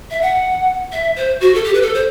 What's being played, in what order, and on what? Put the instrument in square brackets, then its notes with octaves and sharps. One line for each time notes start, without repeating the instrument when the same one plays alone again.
[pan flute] E5
F#5
E5
C5
F#4
A4
G4
B4
A4
C5